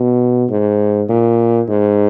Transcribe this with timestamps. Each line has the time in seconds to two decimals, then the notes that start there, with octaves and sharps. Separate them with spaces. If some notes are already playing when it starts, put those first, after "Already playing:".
Already playing: B2
0.50 G#2
1.09 A#2
1.69 G#2